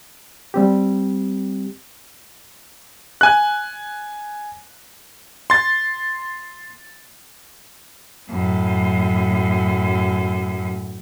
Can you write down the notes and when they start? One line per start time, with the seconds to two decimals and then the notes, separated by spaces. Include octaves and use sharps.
0.54 G3 C4 G4
3.21 G#5 F#6
5.50 C6 A6
8.30 F#2 A2